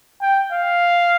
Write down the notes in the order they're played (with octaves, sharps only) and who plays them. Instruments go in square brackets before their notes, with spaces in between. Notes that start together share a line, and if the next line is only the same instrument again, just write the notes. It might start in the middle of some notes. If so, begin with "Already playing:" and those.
[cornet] G5
F5